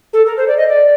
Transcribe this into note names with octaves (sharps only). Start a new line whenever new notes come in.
A4
A#4
C5
D5
D#5
D5